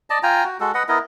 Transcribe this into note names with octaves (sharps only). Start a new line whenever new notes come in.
D5 D#5 A5
F4 G5 G#5 A#5
F#4
G#3 F#4 A4
B4 D#5 F#5
B3 E4 A#4 D#5